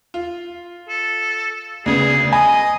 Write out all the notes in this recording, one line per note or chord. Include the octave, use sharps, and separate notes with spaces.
F4
A4
D2 C#3 B3 G#4
D#5 G#5 B5